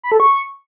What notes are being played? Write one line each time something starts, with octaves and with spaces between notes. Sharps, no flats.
B5
A4
C#6